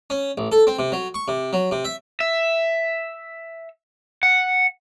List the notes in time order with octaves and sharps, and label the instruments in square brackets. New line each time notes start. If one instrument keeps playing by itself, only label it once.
[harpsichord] C#4
A1
A4
C4
C3
F#3
C#6
C3
F#3
C3
E5
[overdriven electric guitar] E5
F#5